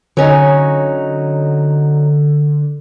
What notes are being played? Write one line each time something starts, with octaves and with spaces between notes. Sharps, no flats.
D3 F#3 C#4 D#4